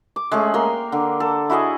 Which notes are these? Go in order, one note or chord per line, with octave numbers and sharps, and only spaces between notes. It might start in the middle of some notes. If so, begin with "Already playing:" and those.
D6
G#3 A3 C#4 G#4
A#3 A#4 G5 C6
D3
A4
E4 F#4 G#4 D#5